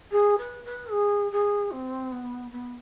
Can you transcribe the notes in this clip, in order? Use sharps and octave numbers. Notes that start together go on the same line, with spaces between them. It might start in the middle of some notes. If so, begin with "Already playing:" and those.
G#4
B4
B4
G#4
G#4
C4
B3
B3